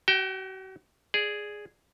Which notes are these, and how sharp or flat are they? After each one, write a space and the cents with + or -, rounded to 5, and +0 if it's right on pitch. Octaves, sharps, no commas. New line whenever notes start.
F#4 +40 G5 +0
G#4 +0 D5 +0